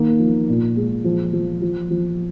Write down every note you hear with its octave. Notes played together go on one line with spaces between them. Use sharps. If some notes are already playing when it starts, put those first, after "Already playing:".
Already playing: D#3 A#3
F3
A#2
G#3
F3
F3
F3
F3